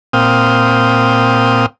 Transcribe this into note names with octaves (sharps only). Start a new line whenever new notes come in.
A#2 C4 F5 G5 D#6